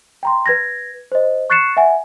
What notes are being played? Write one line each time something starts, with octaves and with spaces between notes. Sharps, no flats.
G5 A#5 C6
B4 G#6 A#6
C5 D#5
C#6 F#6 A6 C7 C#7 E7
E5 F#5 G#5